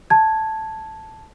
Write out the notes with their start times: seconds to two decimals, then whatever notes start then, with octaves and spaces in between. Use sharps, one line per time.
0.10 A5 G#6